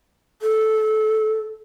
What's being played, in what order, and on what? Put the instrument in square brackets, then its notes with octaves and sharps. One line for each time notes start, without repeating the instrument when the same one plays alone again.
[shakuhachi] A4